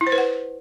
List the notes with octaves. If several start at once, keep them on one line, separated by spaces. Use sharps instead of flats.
E4
C5
B4
F#5